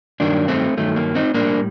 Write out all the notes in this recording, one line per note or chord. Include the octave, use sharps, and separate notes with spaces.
G2 D#3 F#3 A#3 D4
A3 C4
G2 D#3 F#3 A3
A#3
C4 D#4
A2 G3 A#3 D4